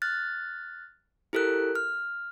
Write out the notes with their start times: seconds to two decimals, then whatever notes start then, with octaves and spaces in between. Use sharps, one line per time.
0.02 F6 F#6 A6
1.33 E4 G4 A4 A#4 F#6
1.75 F6